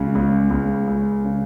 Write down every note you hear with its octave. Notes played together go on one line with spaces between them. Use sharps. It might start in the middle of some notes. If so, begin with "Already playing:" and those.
Already playing: C#2 C#3
C#2
C#2
C#2
C#3